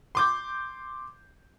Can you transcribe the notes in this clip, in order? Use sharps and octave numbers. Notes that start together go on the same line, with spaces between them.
C6 D6 G6